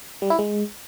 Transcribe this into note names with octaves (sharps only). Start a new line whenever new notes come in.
G3
E4
G#3